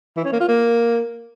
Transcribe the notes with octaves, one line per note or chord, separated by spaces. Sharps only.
E3
C#4
A#3
F4
A#3